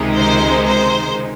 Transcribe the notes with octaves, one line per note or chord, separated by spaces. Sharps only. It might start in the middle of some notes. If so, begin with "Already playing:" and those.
Already playing: C#2 C3 D#3 G#3 D#4
C5
C5